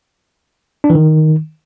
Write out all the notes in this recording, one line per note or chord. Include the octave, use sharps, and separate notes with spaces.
D4
E3
D#3